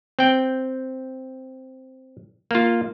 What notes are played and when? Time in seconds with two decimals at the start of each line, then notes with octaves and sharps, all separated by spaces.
0.19 C4 G5
2.51 A#3 F4